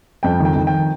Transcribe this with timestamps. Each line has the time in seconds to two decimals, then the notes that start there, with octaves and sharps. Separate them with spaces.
0.23 F2 G5
0.40 D#3 G5
0.56 D#3
0.67 G5